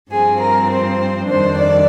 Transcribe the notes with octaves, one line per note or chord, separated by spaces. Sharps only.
G2 F3 C4 G#4
A#4
C5
F2 D#3 G3 D4 C5
D5